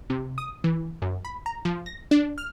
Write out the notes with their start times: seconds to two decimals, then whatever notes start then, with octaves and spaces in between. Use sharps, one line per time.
0.10 C3
0.38 D#6
0.64 E3
1.02 F#2
1.25 B5
1.46 A#5
1.65 F3
1.86 A#6
2.11 D4
2.38 F6